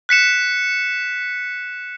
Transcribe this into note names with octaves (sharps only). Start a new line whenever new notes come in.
F#6 B6 C#7 E7